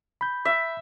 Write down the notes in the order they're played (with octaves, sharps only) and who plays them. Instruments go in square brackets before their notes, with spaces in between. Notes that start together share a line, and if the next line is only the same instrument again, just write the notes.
[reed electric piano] B5 G6
[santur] E5